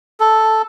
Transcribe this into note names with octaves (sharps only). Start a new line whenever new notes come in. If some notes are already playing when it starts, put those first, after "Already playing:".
A4